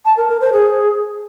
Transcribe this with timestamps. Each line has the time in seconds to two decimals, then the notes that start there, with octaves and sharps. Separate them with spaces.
0.05 A5
0.17 A#4
0.29 A#4
0.41 C5
0.53 G#4